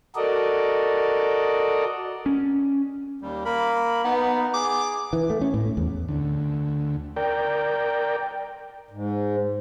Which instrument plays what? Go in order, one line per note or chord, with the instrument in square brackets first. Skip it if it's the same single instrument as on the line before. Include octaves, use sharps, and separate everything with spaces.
[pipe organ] F#4 A4 A#4 D5 D#5
[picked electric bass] C#4
[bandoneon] D#2 G3
A#3 A#4 B5
[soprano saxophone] B3 [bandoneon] D#4
[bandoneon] G#4 [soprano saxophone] D6
[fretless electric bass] E3
A3
C#4
A2
E2
[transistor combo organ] D2
A#4 D5 G5
[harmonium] G#2